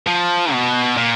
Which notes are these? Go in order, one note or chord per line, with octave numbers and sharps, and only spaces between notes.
F3
B2
A#2